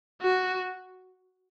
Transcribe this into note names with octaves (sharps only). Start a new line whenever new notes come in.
F#4